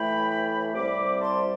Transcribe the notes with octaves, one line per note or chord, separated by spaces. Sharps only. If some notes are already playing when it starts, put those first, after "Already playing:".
Already playing: A2 E3 A3 G5 B5
C2 C3 G3 B5 D6
A5 C6